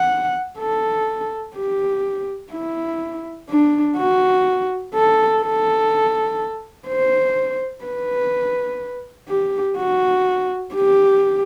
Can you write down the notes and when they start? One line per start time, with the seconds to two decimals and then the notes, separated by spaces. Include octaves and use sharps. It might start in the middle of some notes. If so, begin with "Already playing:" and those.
Already playing: F#5
0.59 A4
1.56 G4
2.52 E4
3.50 D4
3.97 F#4
4.94 A4
5.42 A4
6.88 C5
7.85 B4
9.29 G4
9.78 F#4
10.74 G4